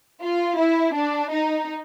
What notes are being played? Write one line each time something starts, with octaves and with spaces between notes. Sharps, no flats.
F4
E4
D4
D#4